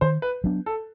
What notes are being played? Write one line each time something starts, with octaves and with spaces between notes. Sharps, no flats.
D#3 C5
B4
F#3 B3 D4
A4